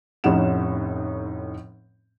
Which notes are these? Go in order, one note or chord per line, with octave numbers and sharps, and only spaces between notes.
F1 A2 C#4 D#4 F#5 E7